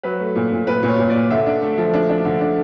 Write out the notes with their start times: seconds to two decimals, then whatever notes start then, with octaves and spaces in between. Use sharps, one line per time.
0.03 F#3 B4
0.20 A3
0.35 A#2
0.51 A#2
0.67 A#2 B4
0.83 A#2
0.88 C#5
0.99 A#2
1.10 D5
1.15 A#2
1.30 D3 E5
1.46 D4
1.62 A3
1.78 F3
1.94 D4
2.09 D4
2.25 D3
2.41 D4